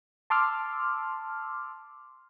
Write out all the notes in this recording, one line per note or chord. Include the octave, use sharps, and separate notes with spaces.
A5 C6 D6 E6 F6